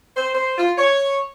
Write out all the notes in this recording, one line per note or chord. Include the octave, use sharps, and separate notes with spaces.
C5
C5
F4
C#5